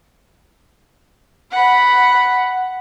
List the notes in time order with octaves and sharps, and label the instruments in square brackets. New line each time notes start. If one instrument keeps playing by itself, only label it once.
[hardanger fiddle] F#5 B5